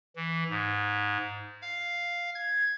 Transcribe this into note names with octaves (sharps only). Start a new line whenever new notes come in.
E3
G#2
F5
G#6